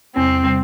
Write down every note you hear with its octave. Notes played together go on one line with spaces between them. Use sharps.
E2 C3 G3 C4
C3 G3